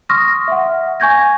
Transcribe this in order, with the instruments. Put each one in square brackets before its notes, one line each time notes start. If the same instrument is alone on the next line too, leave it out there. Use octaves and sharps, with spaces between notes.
[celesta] C6 C#6 D#6 F6 A#6
E5 F#5
G#5 C#6 G6 G#6 A#6